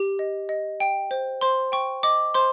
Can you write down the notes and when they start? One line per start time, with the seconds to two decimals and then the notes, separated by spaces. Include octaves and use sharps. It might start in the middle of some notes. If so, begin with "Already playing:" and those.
Already playing: G4
0.19 D#5
0.49 D#5
0.80 G5
1.11 C5
1.41 C5 C6
1.72 G5 C#6
2.03 D#5 D6
2.34 C5 C6